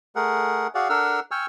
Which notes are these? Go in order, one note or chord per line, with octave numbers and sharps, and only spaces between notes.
A3 G#4 A#4 F#5
F#4 G#4 D5 F5 F#5
D4 A4 A#4 F#5 E6 F6
G5 G#5 C#6 E6 F6